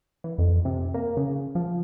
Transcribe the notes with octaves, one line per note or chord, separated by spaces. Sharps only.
E3
F2
C3
A#3
C#3
F3